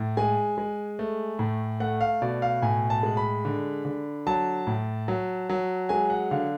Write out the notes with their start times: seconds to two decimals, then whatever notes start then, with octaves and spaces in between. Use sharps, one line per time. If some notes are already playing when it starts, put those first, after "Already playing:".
Already playing: A2
0.17 G#3 G#5
0.58 G#3
0.99 A3
1.39 A2
1.80 A3 F#5
2.01 F5
2.22 B2 D5
2.42 F5
2.62 A2 G#5
2.90 A5
3.03 G#3
3.17 B5
3.45 D3
3.85 D3
4.27 F#3 A5
4.67 A2
5.08 F#3
5.49 F#3
5.89 G#3 G#5
6.10 F#5
6.31 D3 F5